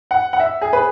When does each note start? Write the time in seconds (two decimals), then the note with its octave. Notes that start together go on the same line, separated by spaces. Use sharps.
0.11 F#5
0.33 F#5
0.40 E5
0.62 G#4
0.73 B4